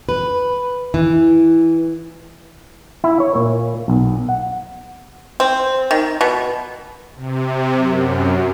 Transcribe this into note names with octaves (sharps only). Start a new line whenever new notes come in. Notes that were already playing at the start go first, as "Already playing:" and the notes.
B4
E3
E4
C#5
A#2
B1
F#5
C4
D#3
B2
C3
F#2